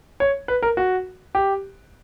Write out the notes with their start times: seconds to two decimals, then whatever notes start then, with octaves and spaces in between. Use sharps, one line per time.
0.20 C#5
0.48 B4
0.63 A#4
0.77 F#4
1.35 G4